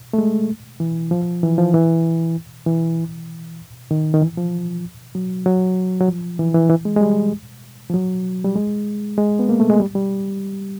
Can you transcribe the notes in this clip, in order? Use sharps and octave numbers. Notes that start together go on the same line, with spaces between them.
A3
G#3
E3
F3
E3
F3
E3
E3
D#3
D#3
E3
F3
F#3
F#3
F#3
F3
E3
E3
E3
G#3
G#3
G3
F3
F#3
G3
G#3
G#3
B3
A#3
A3
G#3
G3
G3